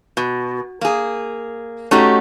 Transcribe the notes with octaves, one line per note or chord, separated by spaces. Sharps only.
B2
A#3 G#4
A3 C#4 D#4 F#4 G4